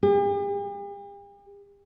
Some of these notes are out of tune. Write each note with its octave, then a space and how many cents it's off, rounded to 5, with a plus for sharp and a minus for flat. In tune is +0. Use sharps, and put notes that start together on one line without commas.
G4 +45